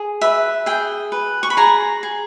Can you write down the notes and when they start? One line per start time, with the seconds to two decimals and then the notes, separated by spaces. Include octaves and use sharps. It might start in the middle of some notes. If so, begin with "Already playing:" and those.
Already playing: G#4
0.21 B4 E5
0.66 G#4 G5
1.12 B4
1.43 C#6
1.50 B5
1.57 G#4 A#5
2.03 G#4